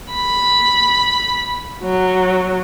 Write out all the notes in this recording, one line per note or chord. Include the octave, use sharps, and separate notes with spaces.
B5
F#3